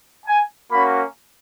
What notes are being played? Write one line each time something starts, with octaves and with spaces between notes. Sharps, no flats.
G#5
A#3 C#4 F#4 B5